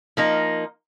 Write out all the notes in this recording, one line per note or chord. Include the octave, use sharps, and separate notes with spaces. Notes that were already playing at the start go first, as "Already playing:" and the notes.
F3 A#3 D#4